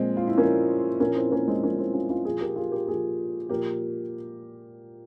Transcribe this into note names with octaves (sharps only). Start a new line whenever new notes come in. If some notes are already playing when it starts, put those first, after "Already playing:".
Already playing: A#2 F3 G#3 C4
F4
E4
A#2 F3 A#3 C#4
A#2 F3 A#3 C#4
C4 E4
A#3 C#4
G#3 C4
A#2 F3 A#3 C#4
C4 E4
C#4 F4
C#4 F4
A#2 F3 F4 G#4
G4 A#4
F4 G#4
G4 A#4
A#2 F3 F4 G#4
A#2 F3 G4 A#4